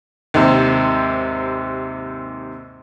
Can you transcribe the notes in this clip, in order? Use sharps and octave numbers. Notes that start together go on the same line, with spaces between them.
D#2 G#2 C3